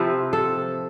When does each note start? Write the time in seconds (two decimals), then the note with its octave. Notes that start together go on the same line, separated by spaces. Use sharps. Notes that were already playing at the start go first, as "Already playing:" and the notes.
Already playing: C3 F3 C4 E4 A4 B4
0.33 A4